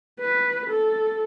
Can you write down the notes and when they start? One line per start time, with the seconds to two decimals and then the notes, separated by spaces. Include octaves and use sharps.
0.20 B4
0.70 A4